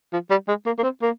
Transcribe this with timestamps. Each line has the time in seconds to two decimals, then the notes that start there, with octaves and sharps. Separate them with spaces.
0.13 F3
0.30 G3
0.48 G#3
0.66 A#3
0.78 A#3
0.83 C4
1.02 A#3